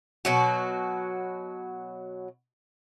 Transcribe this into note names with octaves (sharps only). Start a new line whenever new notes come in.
B2 F#3 F#4